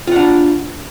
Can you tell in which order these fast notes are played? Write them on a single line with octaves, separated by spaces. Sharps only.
F4 F#5 D4